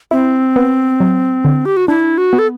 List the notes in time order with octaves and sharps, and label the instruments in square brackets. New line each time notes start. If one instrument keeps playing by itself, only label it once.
[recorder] C4 [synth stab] E4
[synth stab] B3
F#3
D3
[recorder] G4
F#4
[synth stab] D4 [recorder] E4
[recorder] F#4
[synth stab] B3
[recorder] A4